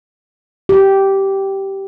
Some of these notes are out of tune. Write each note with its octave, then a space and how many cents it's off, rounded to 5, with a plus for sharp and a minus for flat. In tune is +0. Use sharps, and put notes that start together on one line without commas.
G4 -10